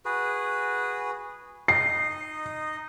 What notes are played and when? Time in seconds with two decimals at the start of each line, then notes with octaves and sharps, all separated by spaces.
0.05 F#4 G#4 B4
1.68 D#4 D#5 C7